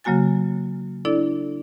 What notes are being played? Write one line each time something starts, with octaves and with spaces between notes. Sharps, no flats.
C#3 F#3 A#3 F#4 G#5 A6
D4 E4 A4 D5